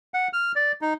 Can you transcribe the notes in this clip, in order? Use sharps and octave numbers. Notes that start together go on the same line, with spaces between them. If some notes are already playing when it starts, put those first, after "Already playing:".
F#5
F6
D5
D#4